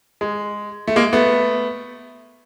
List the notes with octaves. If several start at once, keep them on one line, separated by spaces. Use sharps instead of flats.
G#3
A3
G#3 A#3
A3 B3